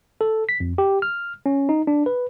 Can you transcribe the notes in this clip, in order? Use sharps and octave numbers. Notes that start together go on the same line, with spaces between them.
A4
B6
F2
G4
F6
C#4
D#4
D4
B4